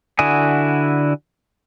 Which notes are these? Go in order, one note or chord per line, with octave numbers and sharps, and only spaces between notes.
D3 E4 F#4 G#5 D#6